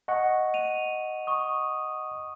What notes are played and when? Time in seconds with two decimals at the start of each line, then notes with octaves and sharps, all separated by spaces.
0.08 D#5 F#5 C#6
0.54 D#7 F7
1.27 C#6 D#6